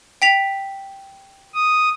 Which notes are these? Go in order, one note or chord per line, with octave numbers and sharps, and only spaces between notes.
G5 B6 F7
D#6